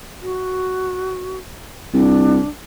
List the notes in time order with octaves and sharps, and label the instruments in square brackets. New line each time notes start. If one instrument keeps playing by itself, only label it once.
[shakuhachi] F#4
[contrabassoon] C2 [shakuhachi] D4